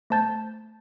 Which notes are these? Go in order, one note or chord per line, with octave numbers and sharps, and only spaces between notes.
A3 C5 A5 G6 A6